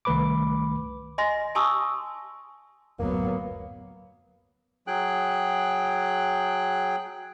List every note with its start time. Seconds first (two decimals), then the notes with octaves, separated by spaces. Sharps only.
0.05 C2 D#3 A3 B4 B5 D6
1.18 D#5 G#5 C6 A#6
1.55 G#5 A5 C6 C#6 D#6 E6
2.99 F#1 D2 A2 F#3 A#3 B3
4.87 F#3 G#4 G5 F#6